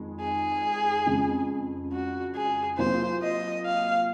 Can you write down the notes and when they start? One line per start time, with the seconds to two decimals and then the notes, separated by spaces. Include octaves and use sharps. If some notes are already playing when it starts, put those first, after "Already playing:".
Already playing: F2 D#3 G#3
0.20 G#4
1.06 F2 C#3 G#3
1.93 F#4
2.35 G#4
2.78 C3 F#3 A#3 F4 C5
3.22 D#5
3.65 F5